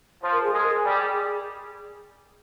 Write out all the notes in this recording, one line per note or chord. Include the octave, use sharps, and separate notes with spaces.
F3
A#4
G#4
G#3 A#4
G#4
G3
G#4